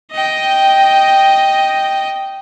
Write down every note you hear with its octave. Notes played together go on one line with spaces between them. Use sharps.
D#5 G5